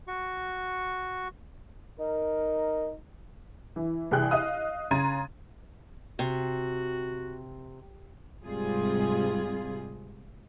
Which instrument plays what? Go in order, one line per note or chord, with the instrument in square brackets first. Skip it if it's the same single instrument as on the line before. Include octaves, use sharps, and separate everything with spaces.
[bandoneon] F#4 C#6
[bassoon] D#4 [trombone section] A#4
[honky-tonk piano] E3
C2 E3 G#4 G5 F#6
D#5 F5 D#6
C#3 A#5 C6 G#6 A6 D#7
[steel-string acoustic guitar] C3 [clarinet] F#4
[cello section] G#2 C3 G3 F4 G#4